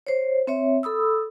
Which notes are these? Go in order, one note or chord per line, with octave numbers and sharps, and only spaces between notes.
C5 C#5
C4 C#5 E5
A4 B5 D#6 E6